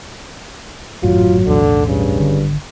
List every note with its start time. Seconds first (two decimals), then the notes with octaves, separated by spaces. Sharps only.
1.03 G#1 F#2 A2 F#3 F4
1.46 B1 E2 A2 D3
1.87 G2 C#3
2.20 G#1 D3